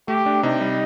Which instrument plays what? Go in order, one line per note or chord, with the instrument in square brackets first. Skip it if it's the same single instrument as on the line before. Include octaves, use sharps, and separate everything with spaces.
[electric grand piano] A3 [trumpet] G4
[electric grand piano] D4
[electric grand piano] C3 [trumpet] D#4
[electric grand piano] G3